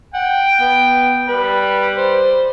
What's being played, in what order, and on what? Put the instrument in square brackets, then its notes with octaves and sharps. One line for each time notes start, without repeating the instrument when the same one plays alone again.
[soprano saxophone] F#5 [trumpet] G5
[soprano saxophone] B3
[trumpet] G3 [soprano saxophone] B4
[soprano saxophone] C5